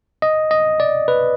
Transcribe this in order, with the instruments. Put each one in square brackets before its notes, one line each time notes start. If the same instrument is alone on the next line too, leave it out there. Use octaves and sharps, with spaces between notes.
[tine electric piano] D#5
D#5
D5
B4